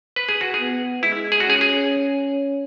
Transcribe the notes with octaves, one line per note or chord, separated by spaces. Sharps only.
B4
G#4
F#4
G#4
B3
G#3 E4
G#4
F#4
C#4 G#4
G#4